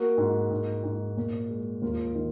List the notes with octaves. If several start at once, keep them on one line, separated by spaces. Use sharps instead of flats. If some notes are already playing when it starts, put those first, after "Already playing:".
Already playing: A#3 F#4 A#4
G#2
G#2
G#2
A#2
G#3
D#2 F4
D#3